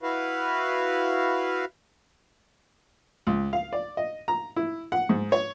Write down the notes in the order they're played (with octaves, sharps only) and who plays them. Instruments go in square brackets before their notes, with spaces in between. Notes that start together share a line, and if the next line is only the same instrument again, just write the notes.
[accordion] E4 F#4 B4 F5
[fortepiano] C#2
F5
D5
D#5
A#5
E4
F#5
G#2
C#5